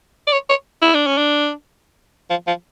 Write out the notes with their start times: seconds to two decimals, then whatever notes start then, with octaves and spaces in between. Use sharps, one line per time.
0.27 D5
0.32 C#5
0.49 C#5
0.82 E4
0.94 D4
1.06 C#4
1.18 D4
2.30 F3
2.47 F3